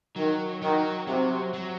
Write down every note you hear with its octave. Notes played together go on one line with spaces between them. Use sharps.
D#3 F#3
D#3 F#3
C3 F#3
F#3